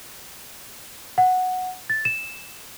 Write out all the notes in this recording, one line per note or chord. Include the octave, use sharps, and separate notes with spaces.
F#5
A6
E7